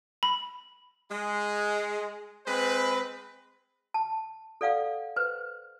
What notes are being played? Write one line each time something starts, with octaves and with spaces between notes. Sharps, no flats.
B5
G#3
G#3 C4 B4
A5
A4 D5 F5 F#5
B4 C5